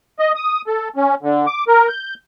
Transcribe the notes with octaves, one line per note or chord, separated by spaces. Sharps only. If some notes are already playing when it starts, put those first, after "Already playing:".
D#5
D#6
A4
C#4
D3
D6
A#4
G6